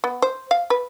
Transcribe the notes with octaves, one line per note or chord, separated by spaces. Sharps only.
B3
C5
F5
B4